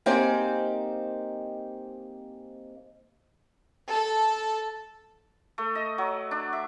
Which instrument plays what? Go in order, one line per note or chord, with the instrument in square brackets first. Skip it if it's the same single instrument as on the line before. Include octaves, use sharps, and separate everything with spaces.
[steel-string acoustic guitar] A#3 C4 D#4 G4 G#4 C5
[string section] A4
[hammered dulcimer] A3
D#5
F#3
D4
E5